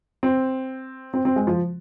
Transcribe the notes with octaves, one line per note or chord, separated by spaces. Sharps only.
C4
C4
C4
G#3
F3